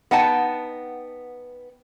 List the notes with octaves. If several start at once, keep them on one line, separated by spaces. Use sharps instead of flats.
B3 D#4 F#5 G5 A5